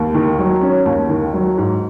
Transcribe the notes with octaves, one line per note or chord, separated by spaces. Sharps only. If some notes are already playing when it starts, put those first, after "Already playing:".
Already playing: D#2
D#3
F#3
C#4
D#2
D#3
F#3
G#2